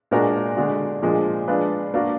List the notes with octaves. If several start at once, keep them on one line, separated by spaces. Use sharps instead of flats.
A#2 G#3 D4 F#4 A#4
D3 G#3 D4 F#4
A#2 F3 G#3 D4
G#3 D4 F4 B4
A#3 D4 F#4 A#4